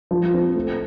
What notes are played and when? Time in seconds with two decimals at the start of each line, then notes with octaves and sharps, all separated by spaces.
0.11 F3
0.34 C4
0.55 A3